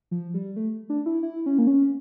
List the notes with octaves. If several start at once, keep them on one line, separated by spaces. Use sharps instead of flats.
F3
G3
A3
D4
E4
E4
C#4
A#3
C#4